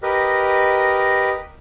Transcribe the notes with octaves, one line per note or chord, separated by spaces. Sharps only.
G4 A#4 B4 D#5